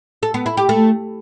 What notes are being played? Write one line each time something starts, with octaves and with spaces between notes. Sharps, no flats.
A4
B3
E4
G4
A3